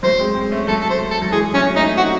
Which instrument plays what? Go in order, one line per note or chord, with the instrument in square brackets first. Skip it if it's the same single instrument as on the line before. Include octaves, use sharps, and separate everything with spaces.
[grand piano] F#3 A3 [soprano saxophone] C5
[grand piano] G#3 C4
G#3 C4
A3 C#4
[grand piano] F#3 A3 [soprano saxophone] A4
[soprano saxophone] A4
C5
A4
[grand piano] F#3
[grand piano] E3 G#3 [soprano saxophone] G#4
[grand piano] F#3 A3 [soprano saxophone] C#4
[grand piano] A3 C#4 [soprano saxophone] D#4
[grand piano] C4 D#4 [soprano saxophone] F#4